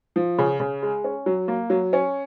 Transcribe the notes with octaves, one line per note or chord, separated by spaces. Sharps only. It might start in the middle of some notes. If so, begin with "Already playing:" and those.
F3
C#3
C#3
G#3
C#4
F#3
A#3
F#3
C#4